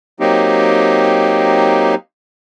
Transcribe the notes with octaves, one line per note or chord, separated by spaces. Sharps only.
F#3 A#3 C4 D#4 G4